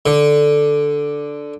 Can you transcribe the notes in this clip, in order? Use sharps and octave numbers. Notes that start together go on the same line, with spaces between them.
D3